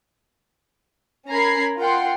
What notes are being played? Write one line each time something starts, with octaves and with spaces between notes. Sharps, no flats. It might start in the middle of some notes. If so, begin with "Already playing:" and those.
C#4 A#4 A#5 B5 G#6 C7
F4 A#4 F#5 G5 C6